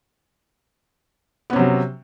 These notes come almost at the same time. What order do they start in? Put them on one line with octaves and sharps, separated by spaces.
B3 C#4 C3 F#3